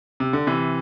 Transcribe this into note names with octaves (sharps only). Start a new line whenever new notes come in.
C3
D3
C3 E3